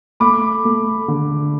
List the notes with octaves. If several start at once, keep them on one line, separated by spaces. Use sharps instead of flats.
A3 B5 D6
A3
D3